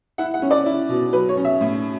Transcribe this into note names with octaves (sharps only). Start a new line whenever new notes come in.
E4 F#5
F#5
C#4
D5
E4
B2
F#3 B4
C#5
C#4
E5
A2